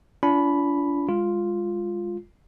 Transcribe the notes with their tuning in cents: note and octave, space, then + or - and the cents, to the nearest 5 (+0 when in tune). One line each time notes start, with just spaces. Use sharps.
D4 -40 F4 -35 B5 +0
G#3 -25 F4 +0